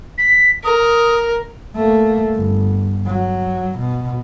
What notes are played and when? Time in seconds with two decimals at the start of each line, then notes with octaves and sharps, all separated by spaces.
0.17 B6
0.64 A#4 D#6
1.76 A3 A#3
2.35 G1
3.07 F#3
3.79 B2